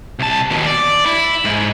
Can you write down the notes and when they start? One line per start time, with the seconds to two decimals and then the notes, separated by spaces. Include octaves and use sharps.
0.19 C2 A5
0.51 D#2 B2
0.66 D5
1.06 E4
1.45 G#2